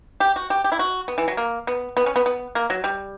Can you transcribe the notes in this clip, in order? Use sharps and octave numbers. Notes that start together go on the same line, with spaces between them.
G4
F#4
G4
G4
E4
F#4
B3
E3
F#3
A#3
B3
B3
C#4
B3
B3
A#3
F#3
G3